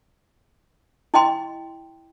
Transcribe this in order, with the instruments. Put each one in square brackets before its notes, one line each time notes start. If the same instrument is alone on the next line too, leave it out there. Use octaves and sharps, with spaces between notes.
[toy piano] E4 D#5 G5 C6